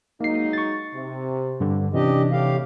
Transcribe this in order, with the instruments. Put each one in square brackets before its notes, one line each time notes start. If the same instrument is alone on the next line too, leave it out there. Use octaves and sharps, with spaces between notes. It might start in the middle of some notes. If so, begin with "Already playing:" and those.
[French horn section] F#3 G#3 D#4 [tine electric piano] A#3 C7
[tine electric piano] C#6 A6
[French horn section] C3
[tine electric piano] G2 D3
[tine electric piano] C3 E3 [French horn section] C#4 D4 [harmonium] G4 D#5
[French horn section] A2 [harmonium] G4 F5